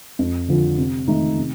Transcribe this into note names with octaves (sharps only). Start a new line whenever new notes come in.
F2
D3 F3
C3
D#3 A3 D#4
C3